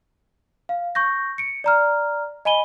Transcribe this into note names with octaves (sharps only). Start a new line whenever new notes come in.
F5
C#6 G6 A#6
C#7 D7
D5 A#5 F6
D#5 G#5 B5 D#7 G7